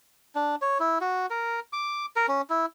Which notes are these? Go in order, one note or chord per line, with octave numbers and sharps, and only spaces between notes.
D4
C#5
E4
F#4
A#4
D6
A#4
C#4
E4